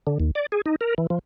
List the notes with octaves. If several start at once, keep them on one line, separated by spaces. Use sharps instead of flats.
D3
D#2
D5
G#4
D#4
A#4
E3
F3